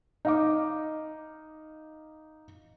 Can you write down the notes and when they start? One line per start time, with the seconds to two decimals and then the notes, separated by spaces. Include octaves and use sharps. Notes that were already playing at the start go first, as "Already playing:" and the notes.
0.25 D#4 F5 D6